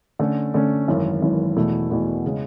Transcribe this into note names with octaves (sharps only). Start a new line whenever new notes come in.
D3 A3 C#4
D3 A3 C#4
G#1 F#2 E3
G#1 F#2 E3
E2 B2 A3 E4
E2 B2 A3 E4
C#3 G#3